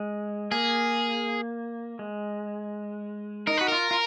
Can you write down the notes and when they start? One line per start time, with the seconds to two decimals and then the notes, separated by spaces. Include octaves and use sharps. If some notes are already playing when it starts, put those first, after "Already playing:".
Already playing: G#3
0.52 A#3 G#4
1.99 G#3
3.47 D#4 A#4
3.57 F#4 B4
3.68 F4 A#4
3.91 F4